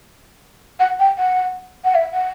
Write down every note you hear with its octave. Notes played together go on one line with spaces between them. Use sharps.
F#5
G5
F#5
F#5
E5
F#5